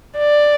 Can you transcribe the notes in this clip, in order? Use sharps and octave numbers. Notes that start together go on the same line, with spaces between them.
D5